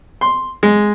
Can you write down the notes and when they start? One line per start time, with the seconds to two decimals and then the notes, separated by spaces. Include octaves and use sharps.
0.21 C6
0.63 G#3